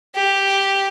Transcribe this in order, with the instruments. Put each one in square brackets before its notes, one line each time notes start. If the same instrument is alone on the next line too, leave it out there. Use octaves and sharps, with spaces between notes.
[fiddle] G4